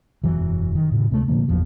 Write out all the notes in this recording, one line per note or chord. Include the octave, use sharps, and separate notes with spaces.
E1 F#2 E3 F#3
D#3
A2 C#3
D2 C3 G#3 A3
A#2 D3 F3 A#3
G1 E2 F3 F#3